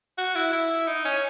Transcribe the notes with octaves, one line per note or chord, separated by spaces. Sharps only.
F#4
E4
E4
D#4
C#4